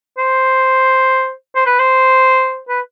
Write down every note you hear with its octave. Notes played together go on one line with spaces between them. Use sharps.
C5
C5
B4
C5
B4